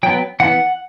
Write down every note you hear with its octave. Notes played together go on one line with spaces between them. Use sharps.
F#3 B3 G5
E3 B3 F#5